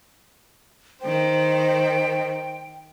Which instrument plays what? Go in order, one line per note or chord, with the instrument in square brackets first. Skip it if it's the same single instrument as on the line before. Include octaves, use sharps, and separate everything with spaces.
[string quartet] D#3 C5 [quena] G5